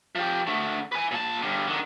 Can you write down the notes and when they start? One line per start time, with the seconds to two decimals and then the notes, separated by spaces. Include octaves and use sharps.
0.15 F3 G4
0.47 D3 A3
0.92 B4 G#5
1.11 A#2 A5
1.42 G2 D3
1.68 D3 D#3